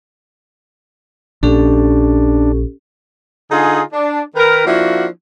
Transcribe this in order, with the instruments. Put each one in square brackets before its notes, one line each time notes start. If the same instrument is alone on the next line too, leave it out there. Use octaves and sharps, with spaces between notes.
[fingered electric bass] A#1 [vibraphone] C#4 G4 A4 [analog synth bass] D4
[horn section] D3 D#4 F4 G#4
D4
D#3 A#4 B4
F3 A#3 D4 E4 F#4